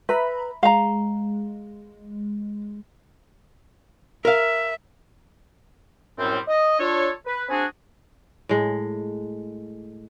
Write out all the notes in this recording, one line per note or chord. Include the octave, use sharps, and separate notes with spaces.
B4 E5 A#5 B5
G#3 F5 A#5
A#4 E5 F5
F#2 A2 G3 C4
D#5
D4 F4 A4 C#5
B4
C4 D4 F#4 G#4 G#5
A2 G#3